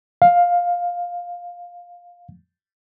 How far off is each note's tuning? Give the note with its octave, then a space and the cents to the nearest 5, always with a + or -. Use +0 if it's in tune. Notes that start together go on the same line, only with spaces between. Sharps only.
F5 +10